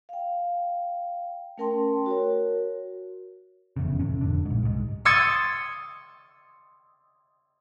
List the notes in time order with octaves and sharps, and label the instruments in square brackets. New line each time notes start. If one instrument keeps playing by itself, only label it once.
[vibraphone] F5 G5
A3 C#4 A#4 G5 A5 C6
F#4 A#4 C#5
[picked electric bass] F1 E2 C#3
E1 A2 C3 C#4
E1 F2 D3
A#1 G#2
C2 G#2
[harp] C6 D#6 E6 G#6 A6 C#7